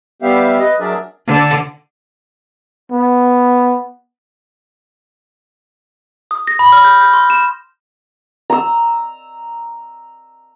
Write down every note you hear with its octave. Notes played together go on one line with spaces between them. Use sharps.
G3 B3 G4 E5 F5
B4 D#5
F#3 D4 G#4 A#4 D5 E5
D3
B3
D#6
A#6
B5
F6
G6
G6
C6
E7
A#5 E6